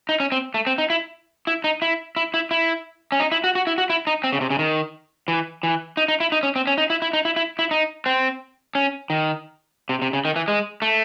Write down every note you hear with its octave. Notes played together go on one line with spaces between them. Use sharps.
D#4
C#4
C4
A3
C4
D#4
E4
E4
D#4
E4
E4
E4
E4
C#4
D#4
E4
F#4
F#4
E4
F#4
E4
D#4
C4
C#3
C3
C#3
D#3
E3
E3
D#4
D#4
E4
D#4
C#4
C4
C#4
D#4
E4
E4
D#4
E4
E4
E4
D#4
C4
C#4
D#3
C3
C3
C#3
D#3
E3
G#3
A3